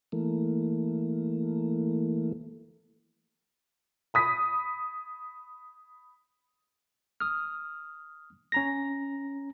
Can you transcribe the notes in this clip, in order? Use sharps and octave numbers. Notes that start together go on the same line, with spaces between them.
E3 A3 A#3
B5 D#6 B6
D#6 F6
C#4 A#5 A#6